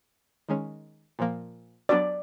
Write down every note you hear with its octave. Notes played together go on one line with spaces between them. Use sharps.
D#3 G#3 C#4
A#2 F3 A#3
F#3 B3 D4 F#4 D5